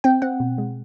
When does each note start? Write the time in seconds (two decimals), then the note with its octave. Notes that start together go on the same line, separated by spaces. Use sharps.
0.04 C4 G5
0.22 C4 F#5
0.40 B2
0.58 G#3